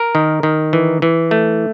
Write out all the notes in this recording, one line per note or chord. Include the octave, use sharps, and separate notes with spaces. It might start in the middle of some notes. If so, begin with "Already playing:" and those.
Already playing: A#4
D#3
D#3
E3
E3
A3